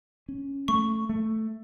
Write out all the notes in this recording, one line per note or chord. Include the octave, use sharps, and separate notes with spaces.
C#4
A3 C#6
A3